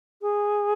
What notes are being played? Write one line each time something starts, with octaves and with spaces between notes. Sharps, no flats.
G#4